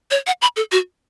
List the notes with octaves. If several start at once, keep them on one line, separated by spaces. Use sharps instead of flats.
C#5
F#5
B5
A4
F#4